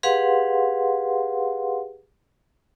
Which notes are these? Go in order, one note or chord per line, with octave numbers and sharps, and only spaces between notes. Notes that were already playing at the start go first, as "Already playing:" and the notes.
G4 G#4 B4 F5 F#5 C6